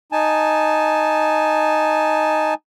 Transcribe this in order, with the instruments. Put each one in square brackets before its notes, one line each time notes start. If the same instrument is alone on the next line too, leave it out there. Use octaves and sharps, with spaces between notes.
[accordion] D#4 G#5 A5